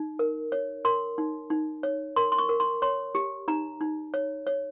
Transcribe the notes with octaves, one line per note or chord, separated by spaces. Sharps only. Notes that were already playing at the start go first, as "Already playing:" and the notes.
Already playing: D#4
A#4
C#5
A#4 C6
D#4
D#4
C#5
A#4 C6
C6
C#6
A#4
C6
C#5 C6
G4
D#4 A#5
D#4
C#5
C#5